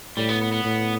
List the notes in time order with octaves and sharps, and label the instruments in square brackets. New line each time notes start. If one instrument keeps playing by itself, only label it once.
[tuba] A2 [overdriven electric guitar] G3
[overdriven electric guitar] B3
B3
B3
[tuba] A2